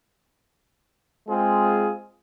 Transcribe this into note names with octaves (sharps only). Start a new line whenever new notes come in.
G#3 C4 F4 G#4